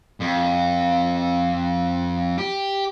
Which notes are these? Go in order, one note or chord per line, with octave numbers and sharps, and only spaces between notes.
F2
G4